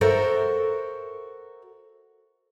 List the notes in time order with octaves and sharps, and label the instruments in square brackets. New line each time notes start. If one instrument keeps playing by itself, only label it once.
[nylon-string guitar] F#4 A4 A#4 C5 E5